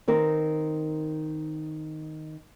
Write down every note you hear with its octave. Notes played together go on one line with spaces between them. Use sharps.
D#3 C4 A#4